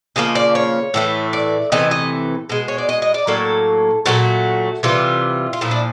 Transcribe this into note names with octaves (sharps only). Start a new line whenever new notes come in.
C#3 F3 A#3 D#5
D5
C#5
A2 E3 A3
D5
C3 E3 A3 D#5
D#5
B2 G#3
C#5
D5
D#5
D#5
D5
A2 F#3 A#3 A4
A#2 F#3 A3 F#4
C3 E3 G3 F4
F4
A#2 F3 A3 E4
D4